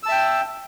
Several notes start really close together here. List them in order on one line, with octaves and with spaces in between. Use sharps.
E6 A5 E5 G5